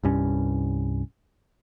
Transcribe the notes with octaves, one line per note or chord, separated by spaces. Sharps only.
C2 G2 C#4